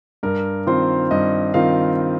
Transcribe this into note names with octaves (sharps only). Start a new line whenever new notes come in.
G2 A#4
D#3 C4 F4 C5
G2 D#5
D#3 C4 F4 F5